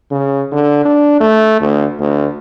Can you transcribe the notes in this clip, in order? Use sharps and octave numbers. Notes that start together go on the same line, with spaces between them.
C#3
D3
D4
A3
D2
D2